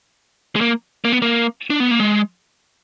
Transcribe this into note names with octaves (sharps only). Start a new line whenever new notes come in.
G#3
A#3
A#3
B3
A#3
D4
B3
A#3
G#3